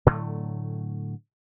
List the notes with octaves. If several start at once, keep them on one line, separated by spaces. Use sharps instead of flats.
A2 D3 F#3 A3